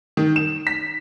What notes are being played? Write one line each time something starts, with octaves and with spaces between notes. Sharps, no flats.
D#3
E7
B6